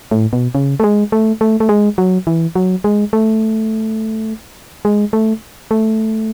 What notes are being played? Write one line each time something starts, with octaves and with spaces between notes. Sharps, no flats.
A2
B2
C#3
A3
G#3
A3
A3
A3
G#3
F#3
E3
F#3
G#3
A3
G#3
A3
A3